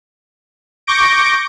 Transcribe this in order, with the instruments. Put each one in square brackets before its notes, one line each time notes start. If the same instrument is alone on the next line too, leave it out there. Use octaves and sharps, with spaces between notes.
[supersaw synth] C#6 D6 G6 A#6 D7